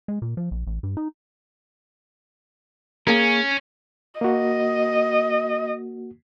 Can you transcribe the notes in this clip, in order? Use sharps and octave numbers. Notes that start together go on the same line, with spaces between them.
G#3
A#2
F3
A#1
A1
G2
D#4
A#3 C#4 G#4 A#4
A#3 F#4 D#5